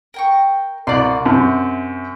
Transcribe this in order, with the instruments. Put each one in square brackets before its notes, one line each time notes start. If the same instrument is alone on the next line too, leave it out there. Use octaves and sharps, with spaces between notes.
[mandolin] A#4 G5 C#6
[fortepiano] C2 D5 [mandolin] F#5 C6
[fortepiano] F#2 C3